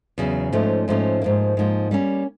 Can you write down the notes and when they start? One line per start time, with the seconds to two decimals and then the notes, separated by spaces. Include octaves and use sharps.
0.18 E2 C#3 F#3
0.52 G#2 F3 A3 C#4
0.88 G#2 F3 A3 C#4
1.22 G#2 F3 A#3
1.57 G#2 F3 A#3
1.91 G3 A#3 C#4